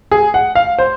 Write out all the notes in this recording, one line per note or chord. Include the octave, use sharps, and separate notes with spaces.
G#4
F#5
F5
C5